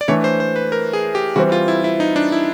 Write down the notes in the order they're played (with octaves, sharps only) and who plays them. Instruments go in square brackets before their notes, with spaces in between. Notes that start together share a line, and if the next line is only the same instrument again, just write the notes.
[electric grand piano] D5
[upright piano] E3 A3 D4 [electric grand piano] C#5
[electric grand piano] C5
C5
B4
A#4
G#4
G4
[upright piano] E3 G3 C4 [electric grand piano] F#4
[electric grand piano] F4
E4
E4
D#4
D4
E4